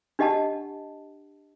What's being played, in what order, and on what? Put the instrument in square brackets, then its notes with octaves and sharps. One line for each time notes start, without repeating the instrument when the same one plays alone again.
[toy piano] D4 G4 D#5 F#5 A5